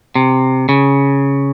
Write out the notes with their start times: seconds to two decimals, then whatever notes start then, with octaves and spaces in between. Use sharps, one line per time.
0.15 C3
0.69 C#3